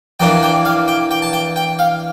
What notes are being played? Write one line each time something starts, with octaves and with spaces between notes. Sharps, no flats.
E2 E3 A#3 D4 G5
G5
F5
G5
G5
A5
G5
G5
F5